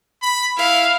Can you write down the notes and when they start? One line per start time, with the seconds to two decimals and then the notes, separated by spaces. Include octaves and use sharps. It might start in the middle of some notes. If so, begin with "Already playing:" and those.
0.22 B5
0.58 E4 F5